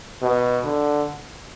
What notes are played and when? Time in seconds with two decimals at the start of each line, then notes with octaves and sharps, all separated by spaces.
0.22 B2
0.65 D3